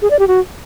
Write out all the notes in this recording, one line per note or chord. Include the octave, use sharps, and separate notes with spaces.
G#4
D5
G4
F#4